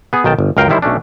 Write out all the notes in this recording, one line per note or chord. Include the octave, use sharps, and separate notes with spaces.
B3 G#4
B1 D#3 G5 A5
G1
C#2 F#2 A#4 F5 G5 A#5
D#3 G3 E4 C5
B1 A3 C#4 D4